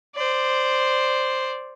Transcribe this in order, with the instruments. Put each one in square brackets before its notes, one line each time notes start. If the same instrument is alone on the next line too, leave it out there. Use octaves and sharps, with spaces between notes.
[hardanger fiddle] C5 D5